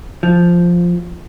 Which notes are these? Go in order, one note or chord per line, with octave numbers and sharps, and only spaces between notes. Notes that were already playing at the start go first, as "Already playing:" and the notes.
F3